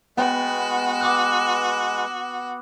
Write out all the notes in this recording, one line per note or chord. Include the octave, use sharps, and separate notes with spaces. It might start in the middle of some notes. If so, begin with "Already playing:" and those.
G#3 B3 F#4 B4 G5
D6 D#6 F#6